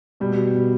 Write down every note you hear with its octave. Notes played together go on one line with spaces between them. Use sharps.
B2 G3
B2
B2